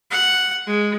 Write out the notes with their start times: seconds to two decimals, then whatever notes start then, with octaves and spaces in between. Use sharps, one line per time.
0.11 F#5
0.67 G#3